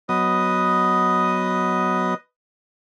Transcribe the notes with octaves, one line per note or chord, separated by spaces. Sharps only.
F#3 B3 B4 D#5 D#6